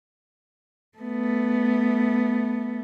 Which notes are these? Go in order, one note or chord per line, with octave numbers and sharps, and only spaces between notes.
A3 B3